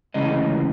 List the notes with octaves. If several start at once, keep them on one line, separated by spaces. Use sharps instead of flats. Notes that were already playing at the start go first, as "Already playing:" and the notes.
D2 C#3 E3 G#3 D#5